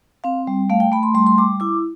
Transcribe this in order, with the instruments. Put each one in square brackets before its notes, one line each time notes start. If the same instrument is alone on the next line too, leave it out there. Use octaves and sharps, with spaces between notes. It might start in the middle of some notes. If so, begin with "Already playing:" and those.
[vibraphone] C4 F5
G3
A3 F5
G5
A3 B5
C6
G3 C6
C6
G3 D6
E4 D6